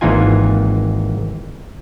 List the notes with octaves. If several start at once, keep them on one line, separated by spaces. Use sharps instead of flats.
G#1 E3 A#3 D#4 F4 G#5